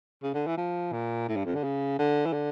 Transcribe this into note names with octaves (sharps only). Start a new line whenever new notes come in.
C#3
D3
E3
F3
A#2
A2
G2
F2
D3
C#3
D3
E3
D3